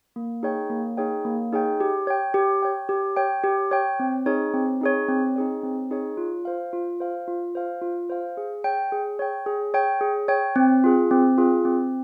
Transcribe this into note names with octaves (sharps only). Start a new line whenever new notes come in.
A#3
D#4 G#4 C#5 G5
A#3
D#4 G#4 C#5 G5
A#3
D#4 G#4 C#5 G5
G4
C#5 G5
G4
C#5 G5
G4
C#5 G5
G4
C#5 G5
C4
D#4 G#4 C#5
C4
D#4 G#4 C#5
C4
D#4 G#4 C#5
C4
D#4 G#4 C#5
F4
C5 F5
F4
C5 F5
F4
C5 F5
F4
C5 F5
G#4
C#5 G5
G#4
C#5 G5
G#4
C#5 G5
G#4
C#5 G5
C4
F4 G#4
C4
F4 G#4
C4